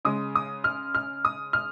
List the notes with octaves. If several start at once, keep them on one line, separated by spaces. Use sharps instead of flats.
C#3 G#3 D#6
D#6
F6
F6
D#6
F6